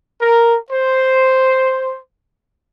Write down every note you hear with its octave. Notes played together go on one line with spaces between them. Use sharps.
A#4
C5